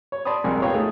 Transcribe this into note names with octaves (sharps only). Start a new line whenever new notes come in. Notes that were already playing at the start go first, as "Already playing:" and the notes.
C#5
D5 A5 B5 C6 D#6
C2 F2 G#3 A#4 G#5 C6
A#3 B3 F4 C#5 F5 G5
A3 D#4 G#4